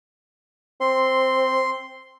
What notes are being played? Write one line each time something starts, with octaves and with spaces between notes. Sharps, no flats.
C4 C6